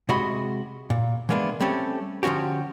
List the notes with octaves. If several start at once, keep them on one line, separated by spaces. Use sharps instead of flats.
C3 G#3 F#4 D#5 B5
A#2
E3 G#3 A#3 B3 D4
G3 A3 C4 C#4 A4
D3 F3 C#4 F#4 G4